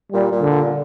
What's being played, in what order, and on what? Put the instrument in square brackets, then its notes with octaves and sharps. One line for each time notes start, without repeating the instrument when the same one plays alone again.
[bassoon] A#2 [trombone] G3
[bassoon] A#2
[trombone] D3
[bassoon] A#2